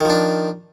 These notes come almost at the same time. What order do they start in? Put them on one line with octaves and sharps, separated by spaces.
D#3 F3 D4